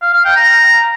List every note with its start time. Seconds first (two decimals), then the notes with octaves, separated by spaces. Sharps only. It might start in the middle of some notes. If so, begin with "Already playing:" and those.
0.02 F5
0.13 F5
0.25 G5
0.36 A#5